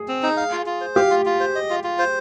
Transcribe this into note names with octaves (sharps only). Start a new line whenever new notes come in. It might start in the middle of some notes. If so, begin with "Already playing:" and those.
Already playing: G#4
C4
D#4
F5
F4
F4
C5
G4 F5
F4
F4
C5
D#5
F4
F4
C5